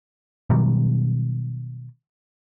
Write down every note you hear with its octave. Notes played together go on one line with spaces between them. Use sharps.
B2 D#3 F#3 G3